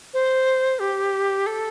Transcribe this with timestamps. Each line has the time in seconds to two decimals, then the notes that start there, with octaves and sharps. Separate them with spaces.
0.14 C5
0.79 G4
1.46 A4